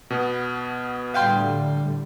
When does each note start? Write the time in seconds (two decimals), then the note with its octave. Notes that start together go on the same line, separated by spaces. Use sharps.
0.10 B2 B3
1.14 A2 D3 G3 F5 G5 C6